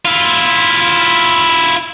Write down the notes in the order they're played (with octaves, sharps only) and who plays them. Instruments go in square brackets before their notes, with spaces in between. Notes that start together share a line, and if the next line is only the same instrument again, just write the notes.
[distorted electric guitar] E4 F4